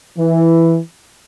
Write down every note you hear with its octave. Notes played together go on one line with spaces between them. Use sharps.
E3